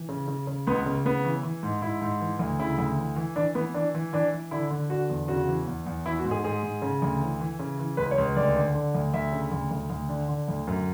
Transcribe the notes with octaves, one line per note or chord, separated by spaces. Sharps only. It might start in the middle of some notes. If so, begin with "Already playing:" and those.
Already playing: E3
C#3
C#3
C#3
C#2 B3
C#3
C#3 B3
E3
E3
G#2
G#2 E4
G#2
E3
D2
C#3 E4
D2
E3
E3
E3 D4
E3 B3
E3 D4
E3
E3 D4
E3
D3 E4
D3
D3 F#4
E2
C#3 F#4
E3
E2
E2
E3 E4
F#4
G#2
G#4
G#2 G#4
G#2
C#3
D2
E3
E3
C#3
E3
C#2 B4
C#5
C#2
D2 D5
D3
D3
D2
D2 E5
C#3
D2
D2
D2
D3
D3
D2
F#2